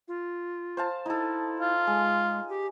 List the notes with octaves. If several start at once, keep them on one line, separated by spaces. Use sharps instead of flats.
F4
C5 F5 A5
D#4 E4 A4
F4
G#3 G#4
G4